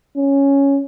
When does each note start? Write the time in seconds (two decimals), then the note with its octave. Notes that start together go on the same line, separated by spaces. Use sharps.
0.17 C#4